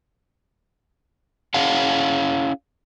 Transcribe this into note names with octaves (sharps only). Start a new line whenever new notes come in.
C#4 E4 G#4 C#5 F5 F#5